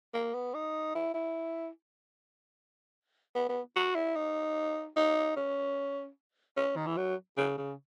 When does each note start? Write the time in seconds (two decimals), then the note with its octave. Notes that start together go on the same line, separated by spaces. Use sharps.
0.14 A#3
0.34 B3
0.54 D#4
0.95 E4
1.14 E4
3.35 B3
3.49 B3
3.76 F#4
3.95 E4
4.16 D#4
4.96 D#4
5.36 C#4
6.57 C#4
6.76 D#3
6.86 E3
6.97 F#3
7.37 C#3
7.57 C#3